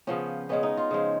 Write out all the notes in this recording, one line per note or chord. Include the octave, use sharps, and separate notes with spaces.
C#3 F3 B3 C#4
C#3 G#3 B3 C#4
D#4
F4
C#3 F3 G#3